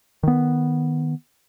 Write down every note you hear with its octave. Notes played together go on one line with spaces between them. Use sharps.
D#3 B3